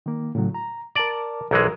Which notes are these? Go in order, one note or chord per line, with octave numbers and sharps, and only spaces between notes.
D#3 A#3
A2 C#3 F#3
A#5
A#4 D5 A5 D6
B1 E3 G#3 A#4